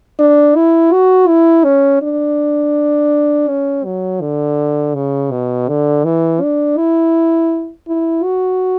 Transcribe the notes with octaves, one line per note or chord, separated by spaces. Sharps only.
D4
E4
F#4
E4
C#4
D4
C#4
F#3
D3
C#3
B2
D3
E3
D4
E4
E4
F#4